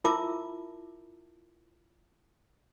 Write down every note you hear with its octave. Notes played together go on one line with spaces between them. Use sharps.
E4 F4 A#4 E5 A5 D6